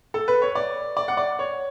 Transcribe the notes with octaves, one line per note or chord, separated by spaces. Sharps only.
A4
B4
C#5
D5
D5
F#5
D5
C#5